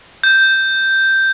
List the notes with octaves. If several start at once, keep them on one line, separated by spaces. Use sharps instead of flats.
G6